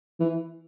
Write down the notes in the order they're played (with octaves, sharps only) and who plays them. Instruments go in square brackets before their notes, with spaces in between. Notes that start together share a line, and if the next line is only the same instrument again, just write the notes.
[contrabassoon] E3